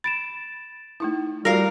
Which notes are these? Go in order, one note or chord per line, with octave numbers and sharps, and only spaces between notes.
B5 A6 D7 E7
A3 D#4 E4
G3 F4 F#4 A#4 F5